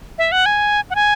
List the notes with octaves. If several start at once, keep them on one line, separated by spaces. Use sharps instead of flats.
E5
F#5
G#5
F#5
G#5